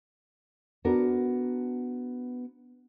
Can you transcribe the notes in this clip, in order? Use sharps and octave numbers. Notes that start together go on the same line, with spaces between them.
B3 D4 F#4 A#4